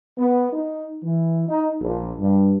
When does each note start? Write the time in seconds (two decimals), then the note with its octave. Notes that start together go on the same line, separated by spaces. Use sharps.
0.18 B3
0.53 D#4
1.04 E3
1.49 D#4
1.81 A#1
2.20 G2